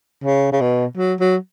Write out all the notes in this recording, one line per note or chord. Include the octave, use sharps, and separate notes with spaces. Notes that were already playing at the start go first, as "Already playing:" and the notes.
C#3
C#3
B2
F#3
F#3